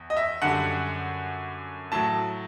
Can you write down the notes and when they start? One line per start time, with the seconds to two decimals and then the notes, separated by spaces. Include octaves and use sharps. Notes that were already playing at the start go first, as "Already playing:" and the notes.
Already playing: E2
0.10 D#5
0.17 E5
0.42 F#2 D3 G3 F#5
1.92 A2 F#3 A5